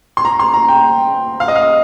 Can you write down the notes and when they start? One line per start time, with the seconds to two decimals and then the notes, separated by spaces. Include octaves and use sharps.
0.17 C6
0.25 A#5
0.39 C6
0.54 A#5
0.69 G5
1.40 F5
1.48 D#5
1.55 F5